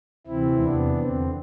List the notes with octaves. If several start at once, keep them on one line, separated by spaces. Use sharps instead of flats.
D2 C3 E3 C4 E4
E2 C3 E3 B3 D4
E2 D3 C4